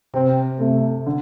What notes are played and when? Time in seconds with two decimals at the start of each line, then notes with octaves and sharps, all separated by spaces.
0.14 C3 C4
0.60 C3 A3
1.06 D3